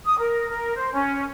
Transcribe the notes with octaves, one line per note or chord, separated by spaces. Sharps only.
D#6
A#4
A#4
C5
C#4